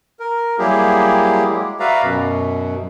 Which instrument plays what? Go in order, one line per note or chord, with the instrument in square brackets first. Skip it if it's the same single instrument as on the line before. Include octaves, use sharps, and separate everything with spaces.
[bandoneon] A#4
F#3 G3 A#3 E4 G4 G#4
G#3
F#4 B4 D5 E5 F5 A#5
F#2 B2